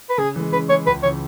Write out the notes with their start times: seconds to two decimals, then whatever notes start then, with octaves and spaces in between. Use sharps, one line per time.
0.10 B4
0.18 C#3 G#4
0.36 E3 G#3
0.52 C#3 B4
0.69 E3 G#3 C#5
0.87 C#2 B4
1.03 C#3 E3 C#5